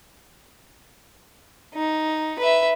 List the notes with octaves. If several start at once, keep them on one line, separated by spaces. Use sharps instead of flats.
D#4
B4 E5